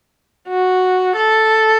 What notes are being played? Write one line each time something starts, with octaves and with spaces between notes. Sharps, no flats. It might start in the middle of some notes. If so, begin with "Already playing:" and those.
F#4
A4